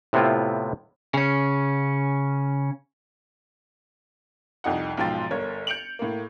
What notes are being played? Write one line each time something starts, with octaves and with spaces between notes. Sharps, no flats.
A2 C3 B3 C4 E4 F4
C#3 C#4
C2 F2 D#4 F#5
B1 G#2 F3 G5 C6 A6
G1 A#4 C#5 G#6
G6 C#7 D7 F7 F#7
A2 A#3